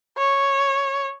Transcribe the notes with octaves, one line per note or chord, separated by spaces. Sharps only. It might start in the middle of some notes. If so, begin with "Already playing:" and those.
C#5